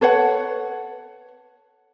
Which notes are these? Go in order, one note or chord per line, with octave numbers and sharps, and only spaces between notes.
A4 B4 C#5 F#5